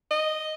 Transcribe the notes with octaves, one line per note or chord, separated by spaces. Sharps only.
D#5